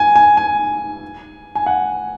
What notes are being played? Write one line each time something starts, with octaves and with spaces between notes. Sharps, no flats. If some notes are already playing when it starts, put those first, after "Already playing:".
Already playing: G#5
G#5
G#5
G#5
F#5